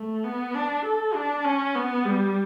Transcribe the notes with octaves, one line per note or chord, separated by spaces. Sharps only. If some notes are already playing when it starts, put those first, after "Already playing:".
Already playing: A3
B3
D4
A4
D4
C#4
B3
G3